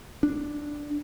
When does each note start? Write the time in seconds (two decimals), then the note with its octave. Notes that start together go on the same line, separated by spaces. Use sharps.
0.23 D4